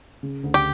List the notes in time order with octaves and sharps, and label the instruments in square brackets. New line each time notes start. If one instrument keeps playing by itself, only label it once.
[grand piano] C#3
D2
[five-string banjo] G4